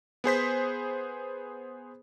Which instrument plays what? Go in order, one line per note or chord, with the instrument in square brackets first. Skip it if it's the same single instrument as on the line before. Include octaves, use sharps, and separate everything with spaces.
[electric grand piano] B3 G#4 C5 B6